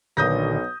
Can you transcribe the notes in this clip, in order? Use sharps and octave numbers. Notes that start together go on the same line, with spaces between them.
B1 A#2 D3 D#3 D#6 G6 A#6